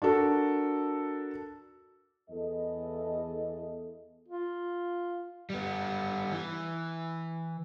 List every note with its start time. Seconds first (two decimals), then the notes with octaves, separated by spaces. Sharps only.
0.02 D4 F#4 A4 A#4
2.30 E2 E3 A4 D#5
4.28 F4
5.50 G3 B3
6.32 E3